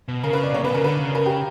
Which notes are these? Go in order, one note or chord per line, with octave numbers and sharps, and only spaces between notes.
B2
C#3 A#4
B4
D5
A#2 C#5
B2 B4
C#3 A#4
D3 B4
C#3
A#4
G4